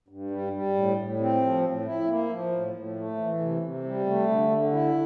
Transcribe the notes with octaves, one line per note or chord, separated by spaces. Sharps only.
G2
G3
G3
A2
A2
C4
F3
A2
E4
A#3
F3
A2
A2
A3
E3
C3
C3
G3
A3
D3
D3
E4